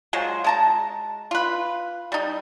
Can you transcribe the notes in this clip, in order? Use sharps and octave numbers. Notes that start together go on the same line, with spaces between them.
F#3 G#3 F4 C5
G#3 A5 A#5
F4 B4
G3 D#4